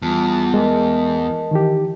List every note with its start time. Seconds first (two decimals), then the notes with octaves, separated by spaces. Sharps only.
0.02 E2 G3 F4 A5
0.54 G#3 A#4 D#5 A5
1.51 D#3 E3 G4